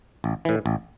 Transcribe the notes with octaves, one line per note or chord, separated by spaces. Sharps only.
A1
A2 E3
A1